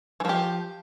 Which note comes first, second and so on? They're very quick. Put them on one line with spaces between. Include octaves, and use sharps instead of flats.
E3 F3 G4